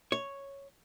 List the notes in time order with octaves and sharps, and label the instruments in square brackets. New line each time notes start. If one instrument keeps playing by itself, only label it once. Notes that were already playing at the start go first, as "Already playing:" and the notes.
[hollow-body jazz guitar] C#5